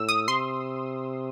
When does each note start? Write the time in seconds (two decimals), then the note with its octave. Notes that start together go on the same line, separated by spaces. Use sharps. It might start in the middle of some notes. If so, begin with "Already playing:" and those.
Already playing: A2 E6
0.09 D#6
0.28 C3 C6